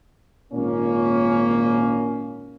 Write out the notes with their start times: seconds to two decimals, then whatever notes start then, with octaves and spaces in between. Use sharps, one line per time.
0.52 G#1 A#2 A#3 C#4